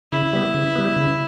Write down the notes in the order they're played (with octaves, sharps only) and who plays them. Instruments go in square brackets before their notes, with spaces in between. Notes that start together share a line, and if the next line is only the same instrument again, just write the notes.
[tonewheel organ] C#3 [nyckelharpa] E4
[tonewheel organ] G3 B3
C#3
G3 B3
C#3